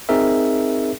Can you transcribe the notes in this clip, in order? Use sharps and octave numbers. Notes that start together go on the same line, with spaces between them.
C4 D#4 G#4 A#4 E5